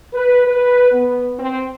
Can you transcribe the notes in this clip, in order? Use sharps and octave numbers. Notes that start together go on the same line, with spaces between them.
B4
B4
B3
C4